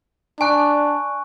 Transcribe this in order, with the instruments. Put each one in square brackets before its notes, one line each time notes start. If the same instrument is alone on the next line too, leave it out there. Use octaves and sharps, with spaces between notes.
[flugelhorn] D4 [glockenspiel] G#5 C#6 F#6